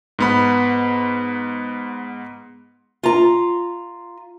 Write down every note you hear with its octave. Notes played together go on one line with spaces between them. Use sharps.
G#2 B3 B5
F4 A#5